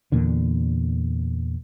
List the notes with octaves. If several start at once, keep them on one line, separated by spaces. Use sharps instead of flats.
E2 A#2 D3